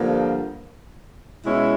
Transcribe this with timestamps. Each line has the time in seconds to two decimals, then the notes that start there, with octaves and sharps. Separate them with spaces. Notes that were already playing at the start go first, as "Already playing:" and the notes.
Already playing: G2 D3 F3 A#3
1.45 B2 G#3 C#4 E4